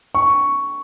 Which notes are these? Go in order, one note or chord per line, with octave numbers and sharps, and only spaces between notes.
C#6